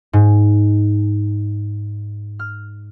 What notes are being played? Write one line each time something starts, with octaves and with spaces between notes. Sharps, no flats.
G#2
F6